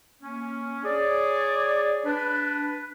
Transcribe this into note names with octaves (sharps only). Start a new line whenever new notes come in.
A#3 C#4
G#4 C#5 D5
D4 B4